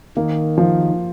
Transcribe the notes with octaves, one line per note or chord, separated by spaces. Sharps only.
D#3 A#3
F3